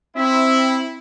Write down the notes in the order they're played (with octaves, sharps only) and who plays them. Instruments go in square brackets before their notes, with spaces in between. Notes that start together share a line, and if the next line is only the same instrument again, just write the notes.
[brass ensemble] C4 E4 [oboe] E5